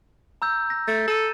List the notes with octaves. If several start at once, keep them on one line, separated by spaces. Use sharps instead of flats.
A#5 E6 G6
A#6
A3 A6
A4 D#7 E7